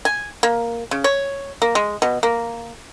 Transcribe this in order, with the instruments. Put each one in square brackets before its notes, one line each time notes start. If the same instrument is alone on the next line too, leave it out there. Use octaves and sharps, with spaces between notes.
[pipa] G#5
A#3
C#3
C#5
A#3
G#3
B2
A#3